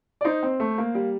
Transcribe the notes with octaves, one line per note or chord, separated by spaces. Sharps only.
D5
D#4 C5
C4
A3
A#3
G3